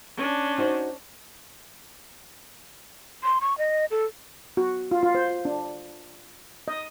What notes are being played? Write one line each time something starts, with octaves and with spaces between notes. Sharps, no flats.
C#4 D4
D#4 F#4 C5
C6
C#6
D#5
A4
F#4
F4
F4
C5
D4
D#5